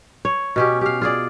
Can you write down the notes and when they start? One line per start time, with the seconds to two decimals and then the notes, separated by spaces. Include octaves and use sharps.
0.25 C#5
0.56 B2 C#4 G4
0.81 G4 F5
1.02 F4 G#4 D5